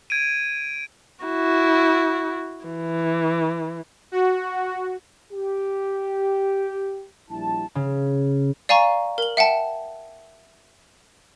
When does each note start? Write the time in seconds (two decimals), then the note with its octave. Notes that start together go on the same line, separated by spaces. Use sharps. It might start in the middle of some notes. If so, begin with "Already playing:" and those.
0.10 G#6 D7 D#7
1.24 E4 F#4
2.65 E3
4.12 F#4
5.31 G4
7.30 A#1 G3 E4 A5
7.75 C#3
8.69 D5 F5 G#5 A#5 C#6
9.18 A#4 F#7
9.37 E5 F#5 G5 A5